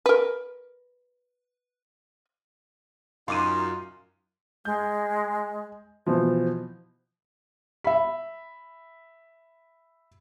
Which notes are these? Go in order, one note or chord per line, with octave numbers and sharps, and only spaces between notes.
A#4 B4
F#2 D#4 F4 C6 D6 D#7
G#3 G6
B2 E3 F3 C5
E5 B5